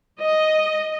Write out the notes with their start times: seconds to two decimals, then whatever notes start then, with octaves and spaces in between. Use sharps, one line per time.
0.20 D#5